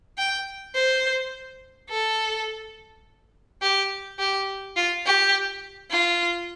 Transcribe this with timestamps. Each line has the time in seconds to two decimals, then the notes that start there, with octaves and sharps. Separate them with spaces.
0.18 G5
0.75 C5
1.89 A4
3.62 G4
4.19 G4
4.76 F4
5.06 G4
5.91 F4